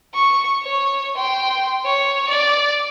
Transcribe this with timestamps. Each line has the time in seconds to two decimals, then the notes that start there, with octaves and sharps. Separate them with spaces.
0.14 C#6
0.63 C#5
1.16 G5 C6
1.85 C#5
2.29 D5